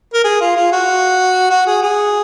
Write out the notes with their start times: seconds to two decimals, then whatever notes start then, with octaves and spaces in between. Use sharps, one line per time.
0.14 A#4
0.24 G#4
0.41 F4
0.56 F4
0.72 F#4
1.50 F#4
1.66 G#4
1.82 G#4